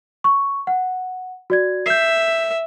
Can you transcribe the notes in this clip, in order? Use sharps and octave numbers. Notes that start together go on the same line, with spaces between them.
C#6
F#5
F#4 D5 G#6
E5 G6 C7